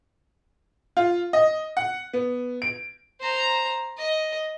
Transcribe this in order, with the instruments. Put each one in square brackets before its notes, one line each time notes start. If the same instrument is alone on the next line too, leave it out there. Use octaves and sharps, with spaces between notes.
[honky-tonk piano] F4
D#5
F#5
B3
D7
[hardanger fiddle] C5 A#5
D#5